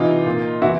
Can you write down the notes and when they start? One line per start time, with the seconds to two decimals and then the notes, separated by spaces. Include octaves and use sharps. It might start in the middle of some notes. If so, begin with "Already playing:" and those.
Already playing: C3 E3 D#4 F4
0.26 A#2
0.61 C3 E3 E4 F#4